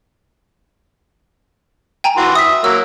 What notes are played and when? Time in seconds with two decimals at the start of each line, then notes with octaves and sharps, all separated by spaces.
2.04 G5 G#5 A#5
2.17 E3 F#4 C6
2.35 E5 D#6 B6
2.64 F#3 A#3 E6